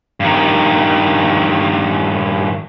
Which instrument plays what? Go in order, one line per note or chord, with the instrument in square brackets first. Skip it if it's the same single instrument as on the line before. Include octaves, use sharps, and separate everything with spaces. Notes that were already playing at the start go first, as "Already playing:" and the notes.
[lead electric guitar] G2 D#3